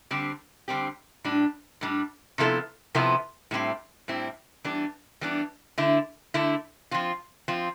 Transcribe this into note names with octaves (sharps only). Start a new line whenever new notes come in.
D3 G3 C4 G4
D3 G3 C4 G4
A2 G3 D4
A2 G3 D4
C3 F3 B3 E4 A4
C3 F3 B3 E4 A4
A2 G3 C4 E4
A2 G3 C4 E4
E3 G3 B3 D4
E3 G3 B3 D4
D3 A3 E4
D3 A3 E4
F3 C4 F4
F3 C4 F4